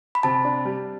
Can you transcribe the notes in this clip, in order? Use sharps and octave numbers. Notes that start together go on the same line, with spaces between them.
B5
C3 A5
D4
G3